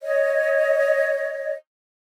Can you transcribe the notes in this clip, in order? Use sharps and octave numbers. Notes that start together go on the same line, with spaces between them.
C#5 D#5